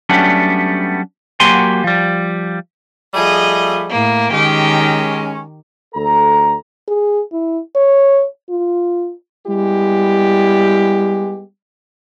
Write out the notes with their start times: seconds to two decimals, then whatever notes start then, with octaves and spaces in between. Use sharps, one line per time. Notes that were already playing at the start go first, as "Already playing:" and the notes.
0.09 F#3 G3 A3 B3 C#4 D4
1.40 F#3 A#3 F#4 G4 G#5 C6
1.84 F3 G3
3.14 F3 G3 A3 G#4 D#5
3.91 A2 A#3
4.32 D#3 G#3 C#4 G4
5.95 D2 A4 A#5
6.88 G#4
7.32 E4
7.76 C#5
8.50 F4
9.47 G3 G#3 B3 E4 G4